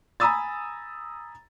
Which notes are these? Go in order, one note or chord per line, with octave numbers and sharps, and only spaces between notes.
G#5 A#5 B5 D#6 E6 A6